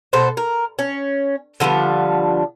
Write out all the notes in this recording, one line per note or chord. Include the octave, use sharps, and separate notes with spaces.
B2 A4 C5
A#4
C#4
D3 F3 G3 B3